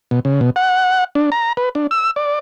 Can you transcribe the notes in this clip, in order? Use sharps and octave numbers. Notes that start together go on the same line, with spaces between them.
B2
C#3
B2
F#5
D4
A#5
B4
D4
E6
D5